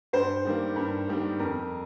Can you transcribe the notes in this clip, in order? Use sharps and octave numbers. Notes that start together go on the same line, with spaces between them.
G2 C5
D#3 G3 A#3
G2
D#3 G3 A#3
F2 A#4